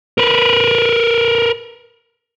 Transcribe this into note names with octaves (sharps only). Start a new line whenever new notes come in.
A#4 B4